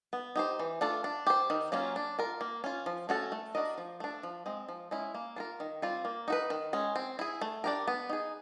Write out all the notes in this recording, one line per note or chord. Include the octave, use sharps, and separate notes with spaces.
B3
D#4 G4 C5
E3
A3 D4 F4 A4
D4
G4 C5
D#3
F#3 A#3 C#4 F4
D4
F4 A#4
A#3
C#4 F4
F3
A3 C#4 F#4 A4
A3
D4 F#4 A#4 D#5
F3
A3 D4
F3
G#3 C4
F3
G#3 C#4 E4
A#3
D4 F4 A#4
D#3
G3 C4 F4
A#3
D#4 F#4 B4
D#3
G#3 C#4
C4
E4 G#4
A3
D4 G4 A#4
B3
D#4 G#4